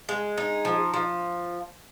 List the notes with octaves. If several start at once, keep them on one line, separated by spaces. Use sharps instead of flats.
G#3
D#4
F3
F3